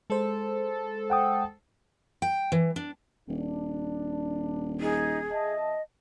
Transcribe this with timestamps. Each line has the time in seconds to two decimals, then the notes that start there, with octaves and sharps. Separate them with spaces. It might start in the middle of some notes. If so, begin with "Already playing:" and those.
0.10 G#3 A4 C5
1.10 F#5 G5 D#6
2.22 G5
2.52 E3
2.76 D4
3.28 D#1 D4
4.80 D#4 G#4
5.31 F2 D#5 E5 A5